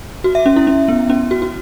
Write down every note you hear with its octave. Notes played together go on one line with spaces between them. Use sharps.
F#4
E5
C#4
E4
C#4
B3
C#4
F#4
F#4